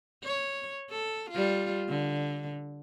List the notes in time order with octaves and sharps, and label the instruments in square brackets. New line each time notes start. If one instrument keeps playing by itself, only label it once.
[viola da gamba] C#5
A4
G3 F4
D3